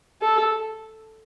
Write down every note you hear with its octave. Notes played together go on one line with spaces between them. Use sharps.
A4